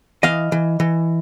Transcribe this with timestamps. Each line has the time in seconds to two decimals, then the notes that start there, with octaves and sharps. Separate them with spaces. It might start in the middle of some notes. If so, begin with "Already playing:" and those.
0.23 E3 D#5 F5
0.52 E3
0.80 E3